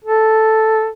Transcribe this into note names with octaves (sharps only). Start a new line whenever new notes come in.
A4